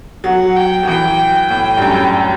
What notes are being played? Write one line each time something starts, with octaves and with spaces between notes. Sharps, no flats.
F#3 F#5
G5
F#3
E3 G5
A2 G5
G2
F#2